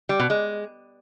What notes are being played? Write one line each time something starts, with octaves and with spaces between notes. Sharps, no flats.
G3
B2
G#3